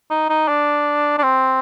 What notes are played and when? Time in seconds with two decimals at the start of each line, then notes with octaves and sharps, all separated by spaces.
0.10 D#4
0.30 D#4
0.48 D4
1.18 D4
1.23 C4